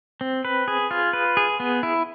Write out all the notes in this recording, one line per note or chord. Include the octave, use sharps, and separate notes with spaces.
C4
B4
G#4
F4
B4
G#4
B3
E4